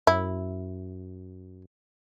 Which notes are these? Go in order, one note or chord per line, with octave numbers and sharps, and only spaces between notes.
F#2 E4